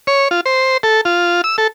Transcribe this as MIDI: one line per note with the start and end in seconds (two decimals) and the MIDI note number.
0.07 0.28 73
0.31 0.41 65
0.46 0.77 72
0.83 1.01 69
1.05 1.41 65
1.44 1.57 88
1.58 1.67 69